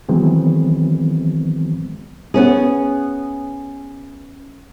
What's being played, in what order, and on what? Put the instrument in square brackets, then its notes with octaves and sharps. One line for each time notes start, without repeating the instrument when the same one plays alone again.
[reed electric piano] D#3 E3 F#3 G#3 B3 C4
[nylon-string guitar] B3 C#4 G#4